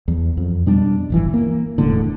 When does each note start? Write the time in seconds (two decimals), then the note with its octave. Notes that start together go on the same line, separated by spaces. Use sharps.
0.08 E2
0.37 F2
0.66 B2 G3 D4
1.10 D1 G1 E3
1.34 A#3
1.78 E1 E2 A2 D3